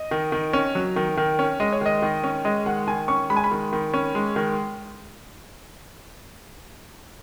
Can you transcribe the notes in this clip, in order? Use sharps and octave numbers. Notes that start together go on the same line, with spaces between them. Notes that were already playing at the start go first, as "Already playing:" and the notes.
Already playing: D#5
D#3
D#3
C#4
F#3
D#3
D#3
C#4
G#3 D#5
C#5
D#3 D#5
D#3
C#4
G#3 D#5
D#3 F#5
D#3 G#5
C#4 C#6
G#3 B5
G#5
B5
D#3
D#3
C#4
G#3
D#3